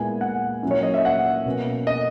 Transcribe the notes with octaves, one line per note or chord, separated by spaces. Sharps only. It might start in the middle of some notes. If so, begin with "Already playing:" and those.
Already playing: A#2 G#3 B3 E4 G#5
F#5
A#2 F#3 C#4 E4
C#5
D#5
E5
F#5
B2 A#3 C#4
D#5